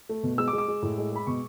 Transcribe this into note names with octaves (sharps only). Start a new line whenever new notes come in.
A3
B2
G#3 E6
D6
G#3
D6
G#3
A2
G#3
G#3 B5
B2 C#6